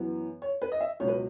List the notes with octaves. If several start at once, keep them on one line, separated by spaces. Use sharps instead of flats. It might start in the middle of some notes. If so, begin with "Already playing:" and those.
Already playing: F#2 E3 B3
C#5
B4
D#5
E5
C#2 B2 F#3 C#5
B4